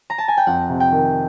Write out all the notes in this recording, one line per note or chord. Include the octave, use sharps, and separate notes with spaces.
A#5
A5
G#5
G5
F2 F#5
C3
G5
D#3